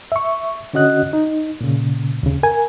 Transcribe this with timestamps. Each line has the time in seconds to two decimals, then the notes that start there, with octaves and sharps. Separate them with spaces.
0.12 E5 C#6
0.73 D3 C#4 F#4 D#5 F#6
1.13 D#4
1.61 A#2 C#3
2.23 D#2 C#3
2.43 A#4 G#5